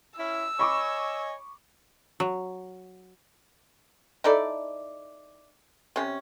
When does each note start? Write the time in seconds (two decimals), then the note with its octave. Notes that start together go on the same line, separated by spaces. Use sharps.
0.19 C#4 E4 E6
0.59 C#5 D#5 G#5 B5 C#6 D6
2.20 F#3
4.24 D#4 E4 A4 D5
5.96 C3 C#4